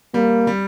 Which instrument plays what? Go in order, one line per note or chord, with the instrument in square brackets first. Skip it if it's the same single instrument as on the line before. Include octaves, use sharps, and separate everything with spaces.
[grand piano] G3 [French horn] A#3
[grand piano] G3